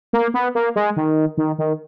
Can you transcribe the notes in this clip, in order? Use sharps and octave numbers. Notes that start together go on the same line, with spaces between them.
A#3
B3
A#3
G#3
D#3
D#3
D#3